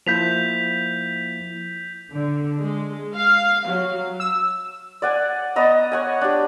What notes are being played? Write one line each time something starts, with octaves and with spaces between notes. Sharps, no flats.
F3 A#3 E4 G6 B6 F7
D3
G#3
F5
F#3
E6
D5 F#5 G#5
B3 D5 D#5 A#5
C#5 F#5 G#5
D4 G4